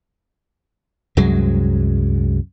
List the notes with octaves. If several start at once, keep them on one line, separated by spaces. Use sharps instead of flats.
C2 F#2 F#3 G#3